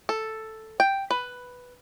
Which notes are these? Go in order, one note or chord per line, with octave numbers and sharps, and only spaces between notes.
A4
G5
B4